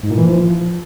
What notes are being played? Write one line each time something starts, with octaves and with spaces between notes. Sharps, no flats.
G#2
A#2
E3
F3